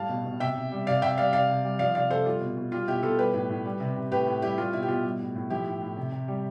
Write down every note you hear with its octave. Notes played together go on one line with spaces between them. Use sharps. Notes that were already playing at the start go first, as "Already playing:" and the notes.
Already playing: A2 G3 F5 A5
B2
B2
C3 E5 G5
C3
G3
C3 D5 F5
C3 E5 G5
G3 D5 F5
C3 D5 F5
C3
G3
F3 D5 F5
C3 D5 F5
C3 A4 C5
G3 F4
B2
B2
G3 F4
B2 E4 G4
B2 F4 A4
G3 G4 B4
A2
A2
G3
C3
C3
A2 G4 B4
A2
G3 E4 G4
G3 F4
B2 E4
G4
B2 F4
G3
A2
A2
F3 E4 G4
A2
A2
C3
C3
G3